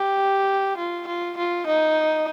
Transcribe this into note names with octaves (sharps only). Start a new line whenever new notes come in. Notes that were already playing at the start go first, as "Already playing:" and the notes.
Already playing: G4
F4
F4
F4
D#4